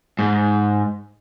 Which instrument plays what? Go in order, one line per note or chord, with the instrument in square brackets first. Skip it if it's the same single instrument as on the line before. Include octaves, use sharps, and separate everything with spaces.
[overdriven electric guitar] G#2